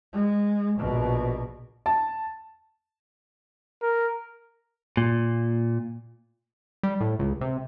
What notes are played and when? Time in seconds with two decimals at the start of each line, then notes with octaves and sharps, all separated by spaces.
0.13 G#3
0.78 A#1 B2
1.86 A5
3.82 A#4
4.97 A#2
6.83 G3
7.01 A2
7.19 C#2
7.41 C3